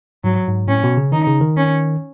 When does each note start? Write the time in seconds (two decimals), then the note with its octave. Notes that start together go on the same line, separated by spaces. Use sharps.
0.24 G#2 F#3
0.48 G#2
0.68 A2 C#4
0.84 B2
0.97 C#3
1.12 D#3 D#4
1.27 C#3
1.41 D#3
1.57 C#4